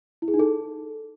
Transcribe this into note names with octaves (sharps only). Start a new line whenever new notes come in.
E4
G#4
D#4
A4